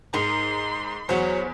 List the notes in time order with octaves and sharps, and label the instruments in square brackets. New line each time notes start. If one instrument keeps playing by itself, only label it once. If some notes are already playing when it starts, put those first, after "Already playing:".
[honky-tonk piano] G#2 [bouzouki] D#4 A#4 [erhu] C6
[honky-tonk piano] E2 [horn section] F#3 [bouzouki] F#4 C5